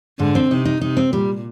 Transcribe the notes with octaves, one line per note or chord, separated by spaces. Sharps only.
G#2 D3
C4
C3 D#4
D#4
C3 D#4
C4
A#2 G3